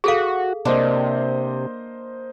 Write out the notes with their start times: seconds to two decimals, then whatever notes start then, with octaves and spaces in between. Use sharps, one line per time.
0.04 F#4 G#4 A4 F5
0.65 C3 A#3 D4 C5 D#5